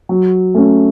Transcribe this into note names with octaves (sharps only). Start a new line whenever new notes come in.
F#3
A3 C#4